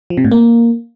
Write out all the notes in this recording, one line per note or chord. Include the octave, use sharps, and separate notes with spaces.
F3
C3
A2
A#3